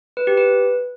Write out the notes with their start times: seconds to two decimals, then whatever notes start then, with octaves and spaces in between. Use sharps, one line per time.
0.17 B4
0.27 G4
0.37 B4